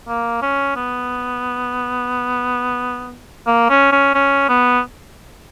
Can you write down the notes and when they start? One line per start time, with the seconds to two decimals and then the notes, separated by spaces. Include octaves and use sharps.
0.08 A#3
0.42 C#4
0.76 B3
3.47 A#3
3.70 C#4
3.92 C#4
4.14 C#4
4.49 B3